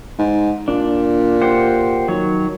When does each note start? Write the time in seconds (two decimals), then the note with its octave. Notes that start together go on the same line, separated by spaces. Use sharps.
0.19 G#2
0.68 A#2 D4
1.42 G4 C5 F#5
2.08 D#3 F#3 C#5